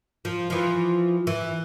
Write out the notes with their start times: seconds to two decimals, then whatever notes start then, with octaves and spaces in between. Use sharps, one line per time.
0.25 F3
0.50 E3 F3
1.27 E3